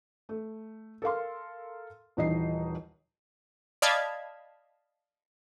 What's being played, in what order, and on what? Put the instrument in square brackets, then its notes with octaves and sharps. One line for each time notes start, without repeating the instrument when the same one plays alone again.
[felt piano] A3
A4 A#4 F5 C6
D#1 E3 D#4 D#5 C7
[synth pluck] D5 D#5 F5 A5 B5 G#6